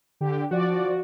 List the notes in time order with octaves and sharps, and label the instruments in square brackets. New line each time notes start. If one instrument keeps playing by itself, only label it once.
[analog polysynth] D3 G4
[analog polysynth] F3 D5 [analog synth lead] F#4